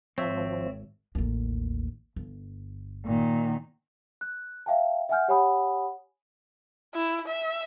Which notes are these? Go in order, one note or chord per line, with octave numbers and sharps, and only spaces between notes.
G#1 F3 C4 C#5 E5
A1 D#2
G1
A#2 D#3
F#6
E5 F5 G5 A5
E5 F#5 G#5 F6 G6
G4 C#5 F#5 G#5 B5 D#6
E4
E5